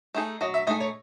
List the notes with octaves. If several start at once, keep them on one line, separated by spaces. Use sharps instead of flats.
A3 D#4 G#4
F#3 D#5
E5
A3 D#4 G#4 D#5
C#5